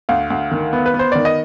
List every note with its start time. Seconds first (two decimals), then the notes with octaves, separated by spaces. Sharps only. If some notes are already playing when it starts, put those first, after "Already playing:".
0.09 D2 F5
0.30 D2
0.51 D#3
0.73 B3
0.86 B4
0.94 B3
0.99 C5
1.12 D#3 D5
1.25 D#5